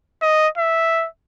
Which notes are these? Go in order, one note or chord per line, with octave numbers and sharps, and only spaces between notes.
D#5
E5